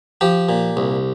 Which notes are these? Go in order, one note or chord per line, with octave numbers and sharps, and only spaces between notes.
F3 G4
A#2
C2